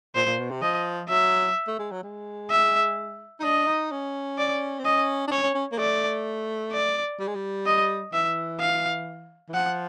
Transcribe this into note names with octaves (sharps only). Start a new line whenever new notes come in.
A#2 C5
A#2
B2
C3
F3 D#5
F#3 E5
A3
G#3
F#3
G#3
E5
D#4
D4 D#5
D#4
C#4
D5
C4
C#4 D#5
D4
C#4 C#5
C#4
C#4
A#3
A3 D5
D5
G3
G#3
G3
D#5
E3 E5
F5
E3
F3 F#5